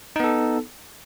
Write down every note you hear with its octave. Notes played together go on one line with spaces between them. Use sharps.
B3 D#4 A4